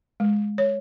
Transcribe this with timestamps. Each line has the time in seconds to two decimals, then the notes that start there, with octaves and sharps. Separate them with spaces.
0.20 G#3
0.58 C#5